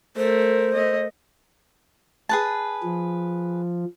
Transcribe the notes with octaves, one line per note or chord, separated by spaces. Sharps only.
A3 A#4 C5
A3 D#5
G#4 B4 A5
F3